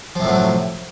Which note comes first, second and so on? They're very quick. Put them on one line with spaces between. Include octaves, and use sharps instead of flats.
F3 C3 A2 F#3